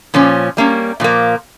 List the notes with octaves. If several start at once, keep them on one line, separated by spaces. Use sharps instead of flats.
A#2 F3 C#4
G3 A#3 C#4
A#2 F3 A#3